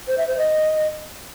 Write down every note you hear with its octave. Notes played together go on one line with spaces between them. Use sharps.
C5
E5
C5
D#5